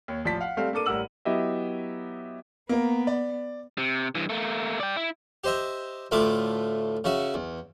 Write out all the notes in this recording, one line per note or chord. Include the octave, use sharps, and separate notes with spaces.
D#2 C#5
A1 F3 D5 A5 B6
F5 F#5
G3 A3 C4 A4 F5
A#3 D4 A4 D6 D#7
A1 G3 A#4 F#5 E6 F#7
F#3 B3 E4 G4 D#5 E5
A#3 B3 A#4
D5
C3
G2 E3
A3 A#3
D5 G5
E4
G4 C5 D#5 E5
D2 A2 A3 E4 F4 D6
C#3 C#4 F#4 E5
E2